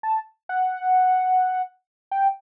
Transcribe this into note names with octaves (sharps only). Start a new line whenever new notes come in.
A5
F#5
G5